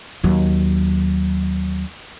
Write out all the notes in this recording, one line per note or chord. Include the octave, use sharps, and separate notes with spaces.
D#2 F#3